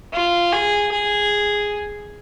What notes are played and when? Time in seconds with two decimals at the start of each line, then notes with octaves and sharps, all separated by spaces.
0.13 F4
0.53 G#4
0.92 G#4